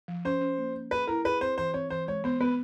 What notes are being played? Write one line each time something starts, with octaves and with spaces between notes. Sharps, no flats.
F3
C#4 C5
C#4
A#3
A#3
G#4 B4
E4 A#4
G#4 B4
C4 C5
E3 C5
C4 C#5
E3 C5
G#3 C#5
B3 C5
B3 B4